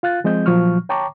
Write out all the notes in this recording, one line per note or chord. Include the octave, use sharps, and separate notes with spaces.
F4 F5 F#6 A6
F3 G#3 C4 D#5 G6
A#2 F3 F#3 C#6 F6
C#5 G5 A5 A#5 C#6 D6